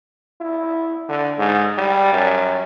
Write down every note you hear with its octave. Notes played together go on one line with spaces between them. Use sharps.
E4
D3
G#2
G3
F#2